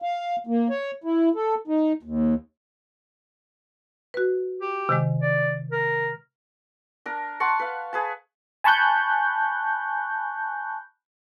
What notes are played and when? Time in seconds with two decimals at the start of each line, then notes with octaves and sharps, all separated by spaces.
0.02 F5
0.47 A#3
0.70 C#5
1.04 E4
1.35 A4
1.68 D#4
2.03 D#2
4.14 F#4 B4
4.61 G4
4.89 C3 D#3 G#3
5.21 D5
5.71 A#4
7.06 D4 A#4
7.40 F#5 A5 C6 C#6
7.60 B4 F5
7.93 G#4 B4 A5
8.64 G#5 A5 B5 C#6 F#6 G6